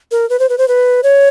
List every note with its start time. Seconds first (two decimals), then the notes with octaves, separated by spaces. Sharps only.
0.12 A#4
0.30 B4
0.39 C5
0.49 B4
0.58 C5
0.68 B4
1.03 C#5